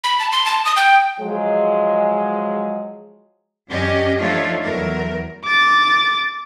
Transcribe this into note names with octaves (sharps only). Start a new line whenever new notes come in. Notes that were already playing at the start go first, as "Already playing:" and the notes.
B5
A5
C6
A5
D#6
G5
F3 F#3 G#3
F#2 C#4 D4 G4 D#5
F3 A3 D4 D#4 F4 C#5
E2 F#3 A3 A#4
D6 A6